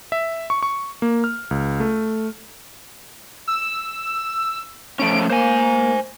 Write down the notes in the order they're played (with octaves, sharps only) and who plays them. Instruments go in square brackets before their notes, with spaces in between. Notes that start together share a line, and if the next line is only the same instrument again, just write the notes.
[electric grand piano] E5
C#6
C#6
A#3
F6
C#2
A3
[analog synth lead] E6
[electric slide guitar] F3 A3 C#4 [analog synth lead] D7
[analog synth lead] A#3 [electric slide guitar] C5 G#5